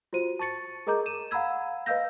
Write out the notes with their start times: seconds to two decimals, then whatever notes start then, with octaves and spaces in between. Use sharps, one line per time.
0.13 F4 F#4 C5 D#7
0.39 A5 C#6 A6 C#7
0.87 G#4 A#4 D#5 A#5 D6 G6
1.06 D#7 E7
1.31 F5 F#5 A#5 B5 E6 G#6
1.86 B4 D#5 F5 E6 G6 A#6